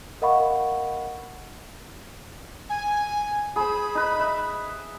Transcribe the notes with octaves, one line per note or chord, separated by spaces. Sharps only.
A#4 D#5 F5 F#5 B5 C#6
G#5
G#4 C5 B5
D#4 B4
E5